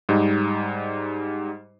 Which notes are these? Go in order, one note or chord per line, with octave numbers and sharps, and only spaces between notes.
G#2 G3 D#4